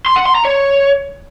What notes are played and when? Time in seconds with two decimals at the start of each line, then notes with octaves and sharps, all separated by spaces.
0.06 C6
0.16 F#5
0.26 C6
0.35 A#5
0.45 C#5